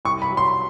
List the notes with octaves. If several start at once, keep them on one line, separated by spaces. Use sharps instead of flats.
C2 C#6
B5
F#3
C6